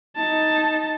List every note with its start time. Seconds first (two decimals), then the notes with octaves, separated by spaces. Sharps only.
0.15 D#4 A5